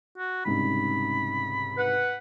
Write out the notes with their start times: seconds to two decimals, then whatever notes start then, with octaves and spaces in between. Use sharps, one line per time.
0.18 F#4
0.45 C2 G#2 C#3 B5
1.77 B4 F#5